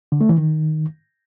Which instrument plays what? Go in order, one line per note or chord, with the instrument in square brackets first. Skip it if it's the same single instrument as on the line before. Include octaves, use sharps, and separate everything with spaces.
[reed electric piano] D3
A3
E3
D#3